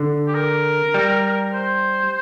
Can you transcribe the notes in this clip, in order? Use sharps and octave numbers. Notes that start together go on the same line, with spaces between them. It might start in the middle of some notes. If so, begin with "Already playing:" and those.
Already playing: D3
G4
A#4
G3
C5